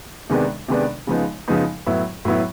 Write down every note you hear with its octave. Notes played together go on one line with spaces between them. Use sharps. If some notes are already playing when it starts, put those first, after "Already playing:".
C3 D#3 G#3 B3 D4
C3 D#3 G#3 B3 D4
C#3 F3 G#3 B3 D#4
C#3 F3 G#3 B3 D#4
A2 F#3 B3 E4
A2 F#3 B3 E4